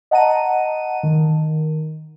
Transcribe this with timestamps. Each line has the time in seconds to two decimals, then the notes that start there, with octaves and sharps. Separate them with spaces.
0.11 D#5 F#5 A5 A#5 D#7
1.03 D#3